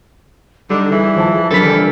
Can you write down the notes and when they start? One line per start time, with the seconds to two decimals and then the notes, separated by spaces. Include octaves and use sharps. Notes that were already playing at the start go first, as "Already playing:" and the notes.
0.70 D3 G3 D#4
0.92 E3 G#4
1.16 F3 A5
1.50 F#2 D3 A4 A#4 B5
1.62 D3 E3 G3